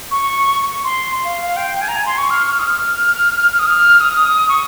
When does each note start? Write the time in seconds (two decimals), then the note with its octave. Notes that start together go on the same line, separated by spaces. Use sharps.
0.11 C#6
0.84 C6
1.25 F5
1.41 F5
1.57 G5
1.81 G#5
1.88 A#5
1.96 G#5
2.06 C6
2.18 C#6
2.30 F6
2.50 F6
2.59 D#6
2.66 F6
3.52 F6
3.59 D#6
3.67 F6
4.01 D#6
4.49 C#6